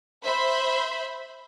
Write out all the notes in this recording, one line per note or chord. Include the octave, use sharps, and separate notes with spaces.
C5 E5 B5